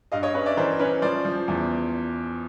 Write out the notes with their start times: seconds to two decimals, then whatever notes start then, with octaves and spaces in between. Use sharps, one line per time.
0.12 G2 D#5 F5
0.23 C#5 D#5
0.34 C#4 B4 C#5
0.46 D5 E5
0.57 E3 A#4 C5
0.79 C#4 B4 C#5
1.02 F3 C5 D5
1.25 F3
1.48 E2